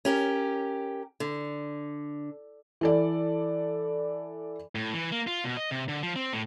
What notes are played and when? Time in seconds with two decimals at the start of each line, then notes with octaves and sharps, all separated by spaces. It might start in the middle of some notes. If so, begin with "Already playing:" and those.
0.05 C#4 G4 A#4
1.20 D3
2.81 E3 A4 D5
4.75 A2
4.93 E3
5.12 A#3
5.27 F4
5.44 B2
5.57 D#5
5.71 C3
5.89 D3
6.03 F3
6.16 C4
6.33 A2